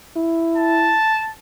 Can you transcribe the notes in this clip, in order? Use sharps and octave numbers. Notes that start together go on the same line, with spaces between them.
E4
A5